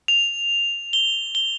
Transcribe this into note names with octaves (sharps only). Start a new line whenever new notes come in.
F7
G7
G7